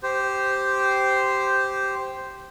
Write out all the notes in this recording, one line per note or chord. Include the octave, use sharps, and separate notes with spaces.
G4 C5